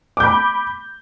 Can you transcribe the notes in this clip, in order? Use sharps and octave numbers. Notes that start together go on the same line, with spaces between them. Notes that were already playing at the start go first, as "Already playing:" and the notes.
B5 D6 G6